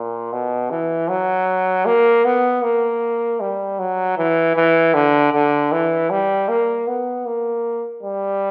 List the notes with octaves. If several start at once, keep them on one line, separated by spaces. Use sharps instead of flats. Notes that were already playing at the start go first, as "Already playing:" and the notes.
Already playing: A#2
B2
E3
F#3
A#3
B3
A#3
G3
F#3
E3
E3
D3
D3
E3
G3
A#3
B3
A#3
G3